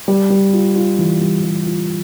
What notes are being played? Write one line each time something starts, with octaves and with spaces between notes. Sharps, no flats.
G3
G3
F4
F4
E3
G3
G3
F4